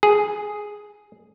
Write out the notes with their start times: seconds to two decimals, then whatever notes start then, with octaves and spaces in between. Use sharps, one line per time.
0.03 G#4